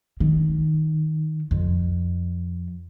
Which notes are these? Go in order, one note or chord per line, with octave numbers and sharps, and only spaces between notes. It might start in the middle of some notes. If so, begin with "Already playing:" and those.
D#3
F2